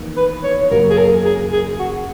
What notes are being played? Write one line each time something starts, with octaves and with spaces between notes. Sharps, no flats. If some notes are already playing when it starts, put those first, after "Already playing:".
Already playing: E2 D#3 A#3
B4
C#5
F#2 C#3 F#3 A#3 A#4
G#4
A#4
G#4
G#4
F#4